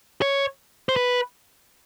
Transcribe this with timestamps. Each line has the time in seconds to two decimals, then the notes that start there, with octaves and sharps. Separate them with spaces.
0.22 C#5
0.89 C5
0.96 B4